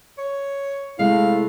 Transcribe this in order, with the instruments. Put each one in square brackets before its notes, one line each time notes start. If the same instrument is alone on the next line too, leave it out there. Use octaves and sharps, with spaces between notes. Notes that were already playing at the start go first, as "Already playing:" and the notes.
[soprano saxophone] C#5
[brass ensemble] C3 A3 E4 [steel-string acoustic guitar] G#3 [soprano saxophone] F5